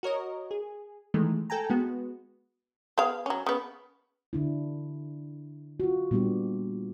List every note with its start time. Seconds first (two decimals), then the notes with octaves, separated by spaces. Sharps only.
0.03 F#4 A#4 C#5 D#5
0.51 G#4
1.14 D#3 E3 G#3 A3
1.50 A4 G5 G#5 A#5
1.70 G#3 B3 F#4
2.98 B3 G#4 F5
3.26 F#3 C#4
3.46 C#3 B3
4.33 D3 D4 E4
5.80 F4 F#4
6.11 A#2 G3 B3 D4 G4